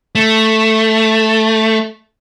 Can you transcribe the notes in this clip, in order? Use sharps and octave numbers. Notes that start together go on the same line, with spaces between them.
A3